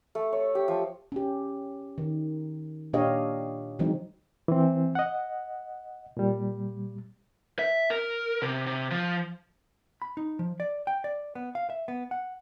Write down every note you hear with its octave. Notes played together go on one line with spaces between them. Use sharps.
A3
C#5
G4
F3
C#4 G4
D#3
A#2 D4 G4 C#5 D#5 F5
D3 E3 F#3 G#3 C4 D#4
E3 C4
D#5 F#5
A#2 G3
E5
A#4
C3
C3
F3
B5
D#4
F3
D5
G5
D5
B3
F5
E5
B3
F#5